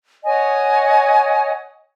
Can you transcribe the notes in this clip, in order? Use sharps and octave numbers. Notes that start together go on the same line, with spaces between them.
C#5 D#5 F#5 G#5